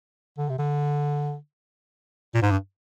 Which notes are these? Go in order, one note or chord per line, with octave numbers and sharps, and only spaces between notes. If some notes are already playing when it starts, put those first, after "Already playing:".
D3
C3
D3
A#2
G#2
G2